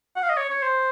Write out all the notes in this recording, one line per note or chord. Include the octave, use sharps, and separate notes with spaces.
F#5
F5
D#5
C#5
C#5
C5